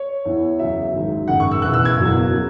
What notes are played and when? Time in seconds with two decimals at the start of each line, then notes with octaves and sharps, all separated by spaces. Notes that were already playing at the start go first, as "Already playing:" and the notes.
Already playing: C#5
0.25 E2 E3
0.59 E2 C#3 F#3 E5
0.93 G#1 G#2 F#3
1.28 G#1 F#2 C#3 F#5
1.40 C#6
1.51 E6
1.62 E1 E2 E3 F#6
1.74 E6
1.85 G#6
1.97 F#1 E2 B2 F#3
2.31 C#3 F#3